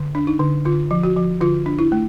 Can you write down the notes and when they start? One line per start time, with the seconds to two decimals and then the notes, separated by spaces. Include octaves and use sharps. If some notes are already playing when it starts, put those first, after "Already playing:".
Already playing: D3
0.15 D4
0.27 D#4
0.40 D3
0.65 D3 F4
0.91 F3
1.03 F#4
1.17 F3
1.41 D3 F4
1.66 D4
1.79 E4
1.92 A3